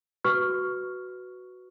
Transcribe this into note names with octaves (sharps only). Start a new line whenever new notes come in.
F#4 B4 C#6 F6